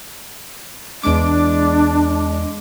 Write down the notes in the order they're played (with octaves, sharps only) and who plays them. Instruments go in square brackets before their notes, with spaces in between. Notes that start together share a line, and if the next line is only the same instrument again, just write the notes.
[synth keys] E2 D6 [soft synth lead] G#3 [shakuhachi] D4